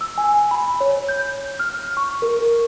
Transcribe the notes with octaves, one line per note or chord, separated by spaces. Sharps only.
E6
G#5
B5
C#5
G6
F6
C#6
A#4